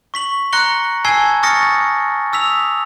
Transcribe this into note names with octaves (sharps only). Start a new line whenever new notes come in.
C#6 B6 F#7
A#5 C6 F#6 A#6 C#7 G7
G#5 A5 E6 G#6 C7 G7
C#6 D#6 F6 A6 A#6 C#7
D#6 E6 B6 F7